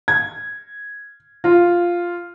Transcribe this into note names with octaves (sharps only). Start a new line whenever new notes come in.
G#6
F4